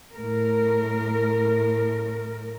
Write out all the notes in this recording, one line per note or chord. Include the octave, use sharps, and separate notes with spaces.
A2 A#4